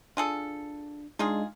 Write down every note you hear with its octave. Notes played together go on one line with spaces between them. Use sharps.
D4 F4 G#4 A4
G#3 D4 D#4 F4 G#4